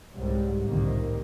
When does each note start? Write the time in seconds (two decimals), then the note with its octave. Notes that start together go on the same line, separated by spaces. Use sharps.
0.14 C2 G#2 F#3 G3
0.64 C2 F2 A2 D3 D#3 A#3